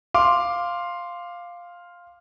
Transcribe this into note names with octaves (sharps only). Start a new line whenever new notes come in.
F5 C6 D6